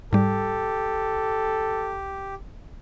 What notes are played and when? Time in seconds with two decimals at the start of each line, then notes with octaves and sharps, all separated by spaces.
0.13 G#2 G3 G4 A4